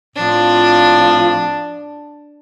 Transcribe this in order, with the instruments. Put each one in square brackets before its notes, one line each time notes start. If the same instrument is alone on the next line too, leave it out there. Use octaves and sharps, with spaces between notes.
[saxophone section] A2 F3 C4 F4 [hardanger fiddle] D4